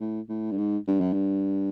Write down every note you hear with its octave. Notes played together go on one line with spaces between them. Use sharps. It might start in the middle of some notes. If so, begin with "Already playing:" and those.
A2
A2
G2
G#2
G2
F#2
G2